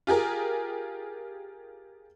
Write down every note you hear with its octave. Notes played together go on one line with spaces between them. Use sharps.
F4 G4 G#4 A#4